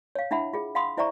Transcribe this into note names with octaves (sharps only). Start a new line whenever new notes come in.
C#5 F5
D4 E4 E5 F#5 B5
F4 G#4
F5 F#5 B5 C6 D#6
E4 C5 D5 E5 A#5 C#6